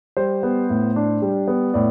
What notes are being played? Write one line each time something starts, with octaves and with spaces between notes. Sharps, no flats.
G3 C5
B3
A2
D4
G3
B3
A2 D5